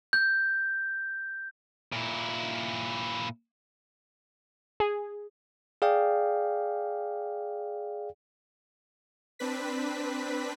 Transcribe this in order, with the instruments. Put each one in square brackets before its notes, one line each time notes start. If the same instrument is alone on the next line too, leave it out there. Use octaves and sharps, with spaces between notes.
[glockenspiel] G6
[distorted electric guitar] A#2 E4
[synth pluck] G#4
[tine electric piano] G#4 D5 F5 G5
[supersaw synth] C4 D4 B4 B6